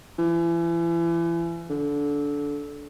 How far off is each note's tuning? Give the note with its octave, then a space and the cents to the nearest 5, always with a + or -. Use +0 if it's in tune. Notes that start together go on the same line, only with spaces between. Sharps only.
E3 +35
D3 -20